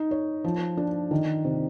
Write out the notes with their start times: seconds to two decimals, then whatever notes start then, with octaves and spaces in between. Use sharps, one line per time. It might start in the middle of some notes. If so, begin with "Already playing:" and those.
Already playing: D#4
0.11 C#5
0.44 F3
0.77 D4
1.11 D#3
1.45 C3